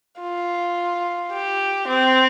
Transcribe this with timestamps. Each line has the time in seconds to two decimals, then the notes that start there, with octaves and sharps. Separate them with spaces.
0.21 F4
1.32 G4
1.88 C4